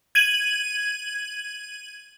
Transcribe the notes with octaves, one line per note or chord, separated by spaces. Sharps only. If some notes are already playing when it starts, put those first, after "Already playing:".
G#6 D#7 F#7